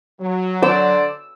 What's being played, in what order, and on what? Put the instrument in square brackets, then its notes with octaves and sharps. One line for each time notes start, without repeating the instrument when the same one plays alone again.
[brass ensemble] F#3
[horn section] D3 C5 D5 [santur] E6